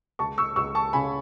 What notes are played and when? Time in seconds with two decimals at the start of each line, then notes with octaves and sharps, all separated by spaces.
0.19 C#2 A5 C#6
0.38 C#6 E6
0.56 C#2 C#6 E6
0.75 A5 C#6
0.93 C#3 G#5 B5